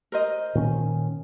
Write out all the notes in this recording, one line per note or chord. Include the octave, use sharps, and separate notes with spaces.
A#4 C5 D#5
A#2 D#3 C#4